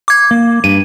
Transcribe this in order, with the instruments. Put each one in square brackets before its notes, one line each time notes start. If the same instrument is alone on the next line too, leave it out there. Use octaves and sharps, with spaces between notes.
[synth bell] D6 G#6
[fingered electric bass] A#3
[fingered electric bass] G2 [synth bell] D#7